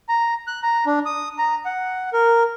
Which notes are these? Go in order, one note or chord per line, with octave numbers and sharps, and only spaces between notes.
A#5
F#6
A#5
D4
D#6
A#5
F#5
A#4